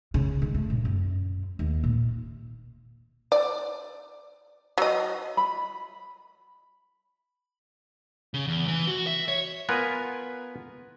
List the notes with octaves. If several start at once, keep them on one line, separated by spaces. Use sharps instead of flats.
C#3
G#2
A3
A#2
F#2
D#2
A#2
D5
F#3 D#5
B5
C#3
E2
E3
F#4
E5
C#5
B3 F4 A#4 B4 G#5